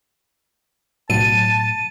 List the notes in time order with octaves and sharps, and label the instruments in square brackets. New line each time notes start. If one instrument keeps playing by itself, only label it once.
[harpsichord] B1 F#4 [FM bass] A2 [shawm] A5 [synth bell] D#7